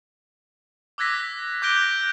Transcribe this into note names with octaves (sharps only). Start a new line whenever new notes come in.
D6 E6 F#6 G#6 A#6 B6
D6 F#6 G6 A#6 D7 G7